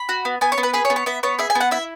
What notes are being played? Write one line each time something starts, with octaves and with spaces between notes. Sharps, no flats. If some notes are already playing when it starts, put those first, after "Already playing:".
Already playing: B5
F#4
B3
B3 G#5
C#5
B3
B4
G#4 B4
C#5
B3
C#5
B3 E5
B3 C#5
G#4 E5
G#5
B3
F#5
E4 E5